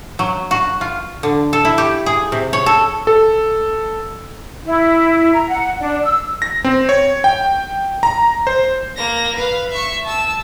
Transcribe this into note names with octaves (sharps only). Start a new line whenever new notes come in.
F#3
F#4
F4
D3
A4
E4
G4
G#4
C3
C#5
A4
A4
E4
A#5
F#5
D4
E6
A#6
C4
C#5
G5
A#5
C5
A#3 A#6
B4 F5
E5 C#6
A5 E6